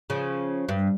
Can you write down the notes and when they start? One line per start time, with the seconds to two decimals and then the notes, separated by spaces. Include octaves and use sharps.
0.10 C#3 F3
0.69 G2